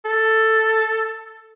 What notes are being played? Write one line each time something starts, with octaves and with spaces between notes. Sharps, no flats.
A4